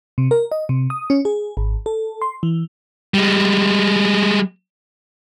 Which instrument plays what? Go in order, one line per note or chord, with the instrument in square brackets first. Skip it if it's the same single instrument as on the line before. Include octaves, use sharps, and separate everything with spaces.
[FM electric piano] C3
A#4
D#5
C3
D#6
C#4
G#4
G#1
A4
C6
E3
[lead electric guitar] G3 G#3